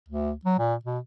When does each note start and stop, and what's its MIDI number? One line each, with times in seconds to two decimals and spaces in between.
0.08 0.32 38
0.45 0.56 54
0.58 0.75 46
0.85 0.99 47